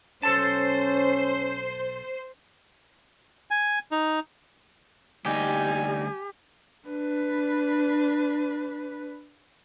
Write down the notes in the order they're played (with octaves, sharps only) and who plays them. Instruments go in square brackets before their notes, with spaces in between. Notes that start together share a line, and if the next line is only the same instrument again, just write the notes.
[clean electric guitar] B1 A4 A5 [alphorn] C#4 [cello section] C5
[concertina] G#5
D#4
[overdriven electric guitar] D2 D#4 [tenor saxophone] G3 [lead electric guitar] G4 [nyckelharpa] G#5
[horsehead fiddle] D4 B4